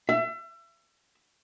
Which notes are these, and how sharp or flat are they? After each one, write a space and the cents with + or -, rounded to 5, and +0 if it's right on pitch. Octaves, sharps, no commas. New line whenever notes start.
E5 +35